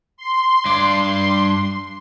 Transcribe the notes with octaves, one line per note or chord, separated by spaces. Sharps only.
C6
G2 D5